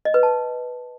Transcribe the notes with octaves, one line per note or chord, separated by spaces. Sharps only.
D#5
B4
A5